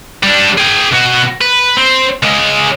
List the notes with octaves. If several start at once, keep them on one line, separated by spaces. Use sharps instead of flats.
G3 D4
G#4 G5
B2 F#4
B4
C4
C#2 G#3